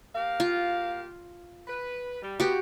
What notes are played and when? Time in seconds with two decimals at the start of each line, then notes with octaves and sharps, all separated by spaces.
0.15 A#3 G4 F5
0.40 F4
1.67 B4
2.22 G3
2.40 B3 F#4 G4